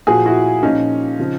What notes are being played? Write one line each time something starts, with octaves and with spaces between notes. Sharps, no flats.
A#2 F3 F#4 G#4
E4 F#4
A#2 F3 C#4 D#4
C#3 F3